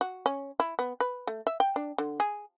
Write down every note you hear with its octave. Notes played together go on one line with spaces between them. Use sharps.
F#4
C#4
E4
B3
B4
A3
E5
G5
D4
D3
G#4